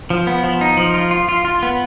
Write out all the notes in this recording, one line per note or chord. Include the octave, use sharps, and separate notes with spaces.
F3
B3
F3
D#4
F3
F4
F4
F4
F4
B3